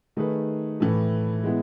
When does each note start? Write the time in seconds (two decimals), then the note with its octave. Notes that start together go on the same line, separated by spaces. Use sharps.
0.17 D#3 A3 D#4 G#4 B4
0.80 A2 E3 A3
1.44 G#3 B3 E4